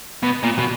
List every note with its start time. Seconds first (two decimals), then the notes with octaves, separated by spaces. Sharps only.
0.23 B2
0.43 A#2
0.58 B2